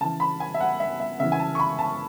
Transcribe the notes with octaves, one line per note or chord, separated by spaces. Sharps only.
C#3 E3 A5
B5
G#5
E5
F#5
E5
E5
C#3 E3 E5
G#5
A5
C#6
B5
A5